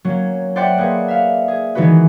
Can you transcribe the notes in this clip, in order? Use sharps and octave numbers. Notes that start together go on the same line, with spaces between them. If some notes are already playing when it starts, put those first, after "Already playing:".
F#3 A#3 C#4
C5 D5 E5 F#5 G5 C6
A#3 G#4 B4 F#5
E5 F5
G#4
D#3 E3 G#3 D#4 F#4 B4